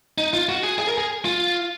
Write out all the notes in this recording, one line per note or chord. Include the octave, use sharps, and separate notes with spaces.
D#4
F4
F#4
G#4
G#4
A#4
G#4
F4